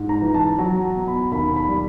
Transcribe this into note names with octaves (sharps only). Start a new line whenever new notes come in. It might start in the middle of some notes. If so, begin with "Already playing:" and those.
Already playing: G#2
A#5
E3
A5
F#3 A#5
B2
B5
D#2 B5
B5
G3